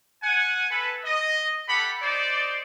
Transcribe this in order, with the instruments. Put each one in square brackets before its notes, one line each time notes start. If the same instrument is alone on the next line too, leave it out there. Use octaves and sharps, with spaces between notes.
[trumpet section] F#5 G#5
A4 B4
D#5
G4 A4 F#5 B5
D#4 C5 D5